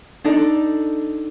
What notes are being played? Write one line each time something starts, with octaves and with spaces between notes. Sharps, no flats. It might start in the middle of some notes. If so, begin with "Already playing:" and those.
D4 D#4 A4 D5